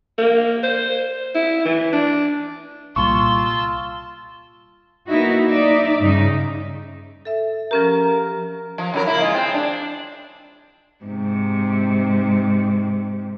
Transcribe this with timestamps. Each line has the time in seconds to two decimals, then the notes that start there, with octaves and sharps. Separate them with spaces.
0.18 A#3
0.63 C5
1.35 E4
1.66 E3
1.93 D4
2.96 C2 A#2 G3 F4 A5 C6 C#6 E6
5.09 A#3 B3 D#4 E4 F#4
5.48 D#4 D5 E5
6.00 G2 C#3 D#4
7.25 A4 E5
7.71 F3 C#4 G4 A#4
8.78 F3
8.94 C#3 F#3 A#4
9.07 A#3 E4
9.20 G#3 F4
9.34 C4
9.54 D4
11.04 G#2 C3